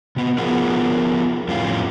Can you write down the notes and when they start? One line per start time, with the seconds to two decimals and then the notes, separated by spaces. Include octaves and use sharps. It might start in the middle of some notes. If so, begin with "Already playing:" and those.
0.16 C3 B3
0.38 F3 B3 F4 G#4 A#4
1.48 F2 A2 F3 G3 C#4 F4